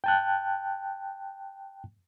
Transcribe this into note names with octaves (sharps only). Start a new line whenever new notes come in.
G5 A5 F#6